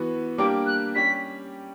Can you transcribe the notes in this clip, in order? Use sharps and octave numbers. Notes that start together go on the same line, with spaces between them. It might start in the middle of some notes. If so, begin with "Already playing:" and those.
Already playing: E3 B3 F#4
G3 A#3 D4 G4 D6
F#6
G3 C#4 G4 B6